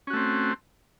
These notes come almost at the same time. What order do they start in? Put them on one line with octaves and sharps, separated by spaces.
C#4 F#4 A3 C4